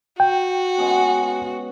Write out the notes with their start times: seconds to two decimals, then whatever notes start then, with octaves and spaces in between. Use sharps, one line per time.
0.20 F#4 G5
0.78 G#3 B3 C#4